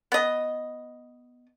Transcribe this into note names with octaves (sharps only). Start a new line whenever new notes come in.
B3 D#5